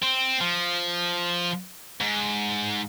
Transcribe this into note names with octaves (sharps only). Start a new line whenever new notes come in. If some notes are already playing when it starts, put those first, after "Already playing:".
C4
F3
G#2